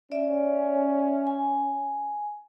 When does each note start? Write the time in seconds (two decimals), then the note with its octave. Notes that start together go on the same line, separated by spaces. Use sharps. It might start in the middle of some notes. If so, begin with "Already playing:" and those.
0.12 C#4 D5 E5
1.27 G#5